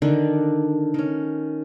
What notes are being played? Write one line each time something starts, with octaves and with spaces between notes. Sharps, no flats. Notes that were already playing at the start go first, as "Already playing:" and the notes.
D3 D#3 D4
D#3 C#4